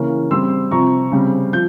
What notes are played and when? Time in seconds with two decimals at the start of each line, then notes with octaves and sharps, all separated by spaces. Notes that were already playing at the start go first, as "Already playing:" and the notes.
Already playing: C#3 E3 A#3 C#4
0.31 C#3 G3 C4 C6 E6
0.71 C3 F3 C4 A#5 C#6
1.12 C#3 G3 C4
1.53 F3 G6